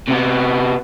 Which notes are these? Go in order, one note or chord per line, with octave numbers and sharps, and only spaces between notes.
C3 B3